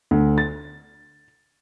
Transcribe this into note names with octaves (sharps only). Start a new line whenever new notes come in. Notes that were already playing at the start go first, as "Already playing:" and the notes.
D2
A6